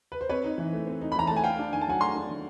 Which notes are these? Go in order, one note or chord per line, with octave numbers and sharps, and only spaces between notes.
B4
C5
C4 B4 C#5
D#4
E3
A3
C4
D#4
B5
E3 A#5
A3 A5
G#5
A3 F5 G5
D4
D#3 G#5
A5
F#3 F#5 G#5
A3 A#5 C6
D4
D#3